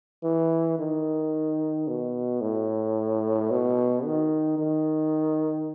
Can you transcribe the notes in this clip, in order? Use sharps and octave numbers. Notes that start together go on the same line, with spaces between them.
E3
D#3
B2
A2
B2
D#3
D#3